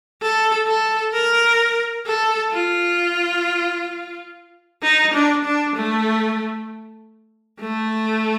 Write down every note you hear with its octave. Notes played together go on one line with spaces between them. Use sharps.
A4
A4
A#4
A4
F4
D#4
D4
D4
A3
A3